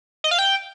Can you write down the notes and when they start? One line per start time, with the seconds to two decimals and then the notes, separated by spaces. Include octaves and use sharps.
0.24 D#5
0.31 F5
0.38 G5